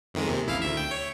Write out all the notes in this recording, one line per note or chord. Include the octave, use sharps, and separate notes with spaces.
F2 D#3 G#3
D#2 C3
A1 E4 F5
D2 E5
G5
C#5